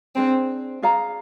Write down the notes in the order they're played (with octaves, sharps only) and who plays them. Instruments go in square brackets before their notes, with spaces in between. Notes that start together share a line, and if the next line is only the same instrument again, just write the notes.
[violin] C4 [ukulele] D4 G#4 C5
[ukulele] G#4 D5 F5 A#5